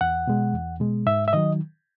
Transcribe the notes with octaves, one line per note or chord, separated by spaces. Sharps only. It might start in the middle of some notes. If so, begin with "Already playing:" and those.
E2 F#5
B2 G#3
E2
B2 G#3
G#2 E5
E5
D#3 F#3 D#5